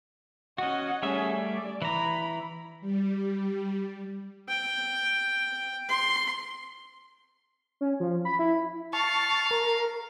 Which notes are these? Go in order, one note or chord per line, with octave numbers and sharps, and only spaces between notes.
C#4 F#4 D#5 F#5
G3 A3 C#4 G#4 E5
D5
E3 A#5 B5
G3
G5
C6
C#4
F3
B5
E4
F5 A5 C#6
A#4